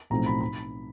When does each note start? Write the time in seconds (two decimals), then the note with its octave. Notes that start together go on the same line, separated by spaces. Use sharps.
0.10 B1 A2 F3 A3 C4 A#5
0.26 B5
0.41 B5